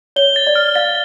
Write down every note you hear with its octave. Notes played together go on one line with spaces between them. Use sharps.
C#5 G7
A6
D5
F6
F5 A6